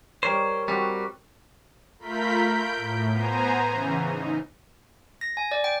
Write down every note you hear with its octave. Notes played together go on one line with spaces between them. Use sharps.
G3 A#4 C5 C#5
G3 C4 F#4
A3 F4 A#4 B5 G6 B6
G6 D7
A2
B3 C5 G#5 A#5
C#3 E3
D#4
A#6
G#5
D5
G5